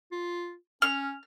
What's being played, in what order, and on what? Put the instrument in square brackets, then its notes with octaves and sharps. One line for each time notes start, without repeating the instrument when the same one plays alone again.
[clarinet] F4
[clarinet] C#4 [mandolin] F6